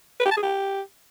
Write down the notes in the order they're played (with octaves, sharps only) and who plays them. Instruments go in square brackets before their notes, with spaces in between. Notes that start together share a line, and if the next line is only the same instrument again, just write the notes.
[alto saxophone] B4
G4
A5
G#4
G4